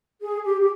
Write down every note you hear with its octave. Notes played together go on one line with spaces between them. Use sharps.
G#4
G4
G4